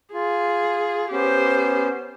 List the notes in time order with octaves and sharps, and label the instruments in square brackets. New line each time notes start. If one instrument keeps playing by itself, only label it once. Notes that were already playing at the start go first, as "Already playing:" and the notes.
[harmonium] F4 [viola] G#4
[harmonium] B3 C#4 [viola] G4 C5